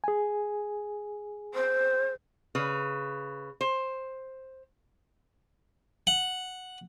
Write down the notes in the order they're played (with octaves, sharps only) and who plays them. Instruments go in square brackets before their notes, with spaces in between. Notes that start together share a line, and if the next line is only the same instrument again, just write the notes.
[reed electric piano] G#4 G#5
[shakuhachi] C5
[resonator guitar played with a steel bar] C#3 B4
C5
[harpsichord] F#5